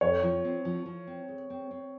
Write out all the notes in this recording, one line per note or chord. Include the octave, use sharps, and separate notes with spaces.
F2 C#5
F3
C4
F3
F3
C4
G#3
C4
C4